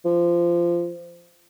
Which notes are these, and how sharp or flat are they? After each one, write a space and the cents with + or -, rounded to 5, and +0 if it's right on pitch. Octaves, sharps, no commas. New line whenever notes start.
F3 -20